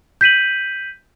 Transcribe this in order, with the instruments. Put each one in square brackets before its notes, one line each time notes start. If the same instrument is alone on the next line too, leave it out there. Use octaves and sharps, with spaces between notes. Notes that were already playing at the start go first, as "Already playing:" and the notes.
[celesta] G6 B6 D#7 F#7